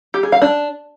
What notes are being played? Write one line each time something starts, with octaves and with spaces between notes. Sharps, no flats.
G4
G#4
F5
D4